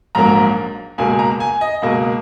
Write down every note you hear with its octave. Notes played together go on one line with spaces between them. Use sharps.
A#1 G#2 F#3 A#3 A#5
C#2 B2 A#3 G#5
A#5
G#5
D#5
C#2 B2 A#3